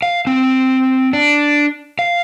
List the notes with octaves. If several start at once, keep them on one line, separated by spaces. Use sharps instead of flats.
F5
C4
D4
F5